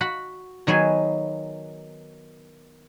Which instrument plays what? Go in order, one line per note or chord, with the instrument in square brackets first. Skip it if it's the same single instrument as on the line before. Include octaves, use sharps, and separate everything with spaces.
[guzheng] F#4 F#5 B5
D#3 F#3 B3 G#4 G#5